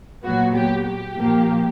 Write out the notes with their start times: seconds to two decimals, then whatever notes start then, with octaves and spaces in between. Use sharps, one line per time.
0.23 A#2 F#3 B3 F#4
0.55 G4
0.86 G4
1.17 A#2 F3 A#3